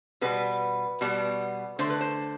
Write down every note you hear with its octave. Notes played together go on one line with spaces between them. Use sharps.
B2 G3 B3 B4
B2 G3 B3
D3 A3 C5
B4
C5